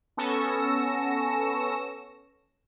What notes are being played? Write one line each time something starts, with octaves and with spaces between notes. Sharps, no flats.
B3 C#4 A4 C#6 A#6 E7